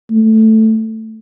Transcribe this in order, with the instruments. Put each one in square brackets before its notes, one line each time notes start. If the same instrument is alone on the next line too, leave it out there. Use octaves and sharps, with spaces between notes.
[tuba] A3